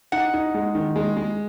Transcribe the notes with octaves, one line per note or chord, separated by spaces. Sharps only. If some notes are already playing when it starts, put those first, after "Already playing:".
D#4 F#5
D#4
G#3
D#3
G#3
G#3